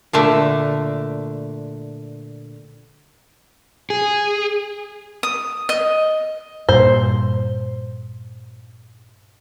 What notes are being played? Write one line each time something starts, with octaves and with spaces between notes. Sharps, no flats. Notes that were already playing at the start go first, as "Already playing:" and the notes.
A#2 D3 A3
G#4
D#6
D#5
G2 A#2 C5